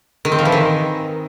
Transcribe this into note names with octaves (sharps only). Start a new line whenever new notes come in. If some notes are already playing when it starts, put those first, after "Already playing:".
D#3
C4
F3
E3
D#3